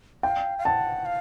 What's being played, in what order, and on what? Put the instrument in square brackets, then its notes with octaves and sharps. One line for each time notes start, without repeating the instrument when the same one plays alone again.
[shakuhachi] F5 [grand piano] G5
[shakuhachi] F5
[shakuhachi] F#5 [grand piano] A5
[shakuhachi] F5